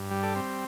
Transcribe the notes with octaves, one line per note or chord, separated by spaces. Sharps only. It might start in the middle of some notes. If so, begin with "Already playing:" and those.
Already playing: G2
G3
A4 D5
C4